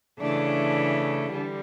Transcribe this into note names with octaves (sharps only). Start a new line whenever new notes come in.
C#3 E3 A3 D4
D3 G3